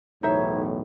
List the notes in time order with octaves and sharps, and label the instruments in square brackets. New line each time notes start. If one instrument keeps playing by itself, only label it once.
[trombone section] B1 E2 A2 [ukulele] D#4 C5 E5 [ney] C#5